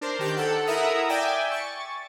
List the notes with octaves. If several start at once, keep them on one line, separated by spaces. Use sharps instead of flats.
D4 A#4 C5
D#3 G4 G6
A4 F#5
E4 A#4 E5 F#5 A#5 D#6
D5 E5 G5 G#5
C#6 A6